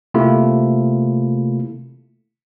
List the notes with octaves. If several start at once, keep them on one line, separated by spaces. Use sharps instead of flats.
C3 A3 A#3 E4 F4